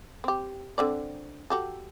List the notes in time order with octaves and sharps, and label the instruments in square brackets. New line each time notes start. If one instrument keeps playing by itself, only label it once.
[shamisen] C4 G4
D3 C4 D5
F#4 G4 A4